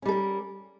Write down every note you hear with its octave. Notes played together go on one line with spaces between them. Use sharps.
G3 C#4 A4 A#4